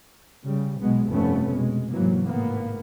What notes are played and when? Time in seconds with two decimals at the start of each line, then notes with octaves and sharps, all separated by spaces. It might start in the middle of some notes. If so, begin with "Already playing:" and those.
0.45 C#3 G3
0.79 B1 B2 G#3 B3
1.09 F1 G2 A3 B3 C#4
1.51 B2 G#3
1.90 G#2 C3 E3 F#3 A#3
2.25 G#1 A2 A#3 B3